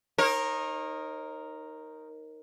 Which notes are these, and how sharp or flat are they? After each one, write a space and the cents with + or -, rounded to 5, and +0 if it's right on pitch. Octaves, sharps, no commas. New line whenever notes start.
D#4 +0 A#4 +0 C#5 -45